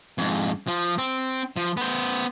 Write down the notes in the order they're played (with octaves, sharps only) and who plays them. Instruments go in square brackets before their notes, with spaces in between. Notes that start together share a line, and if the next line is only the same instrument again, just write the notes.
[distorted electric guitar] F2 G#2
F3
C4
F3
B3 C5